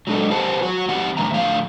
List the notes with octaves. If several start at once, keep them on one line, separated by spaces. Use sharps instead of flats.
F#3 G#3 D4 A4 D#5
G4 B4 C5 F#5 G#5 A5
F#3 F#4 C#5 F#5
E3 C4 G4 F#5
A2 D3 E3 A#3 E5 A#5
A2 D3 F3 F5